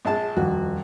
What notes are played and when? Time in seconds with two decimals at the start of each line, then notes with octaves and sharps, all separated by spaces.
0.05 A#1 G#3 A5
0.37 D#1 F2 F#4